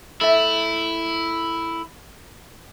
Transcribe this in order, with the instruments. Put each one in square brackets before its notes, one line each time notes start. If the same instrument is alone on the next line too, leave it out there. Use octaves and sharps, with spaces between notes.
[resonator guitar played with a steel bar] A3 E5 [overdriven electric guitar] E4